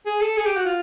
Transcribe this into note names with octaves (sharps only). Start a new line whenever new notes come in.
G#4
A4
G#4
G4
F#4
F4